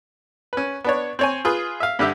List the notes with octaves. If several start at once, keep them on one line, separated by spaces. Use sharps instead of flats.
C#4 B4
B3 D4 C#5
C4 C#5 G#5
F4 G#4 B4
E5 F5
G2 D3 G4 E5